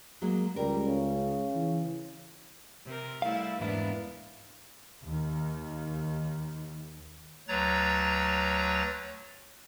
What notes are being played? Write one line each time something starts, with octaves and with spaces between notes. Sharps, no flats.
F#3 G#3 A#3
C#2 G3 A#4
C#3
E3
C3 A#4
G3 A3 E4 F5
E2 G#2 A#3 B3 D4 E4
D#2 D#3
D2 F#3 B4 C#5 A#5 A6